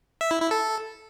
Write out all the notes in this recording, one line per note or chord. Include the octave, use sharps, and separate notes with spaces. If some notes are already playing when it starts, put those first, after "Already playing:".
E5
E4
E4
A4